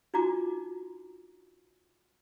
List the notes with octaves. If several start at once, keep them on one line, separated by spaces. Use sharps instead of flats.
D4 D#4 F4 F#4 A#5 D6